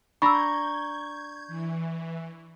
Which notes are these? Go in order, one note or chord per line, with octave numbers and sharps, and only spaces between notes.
D4 A#5 B5 C#6 E6 G6 G#6
E3